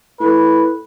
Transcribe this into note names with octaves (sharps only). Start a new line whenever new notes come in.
A2 B4